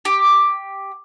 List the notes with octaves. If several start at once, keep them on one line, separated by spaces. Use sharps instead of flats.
G4